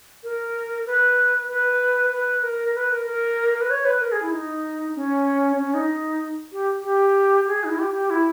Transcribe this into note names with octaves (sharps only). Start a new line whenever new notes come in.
A#4
B4
B4
B4
A#4
B4
A#4
A#4
A#4
B4
C#5
B4
A#4
G#4
E4
D#4
C#4
C#4
D#4
G4
G4
G#4
D#4
E4
G4
G4
E4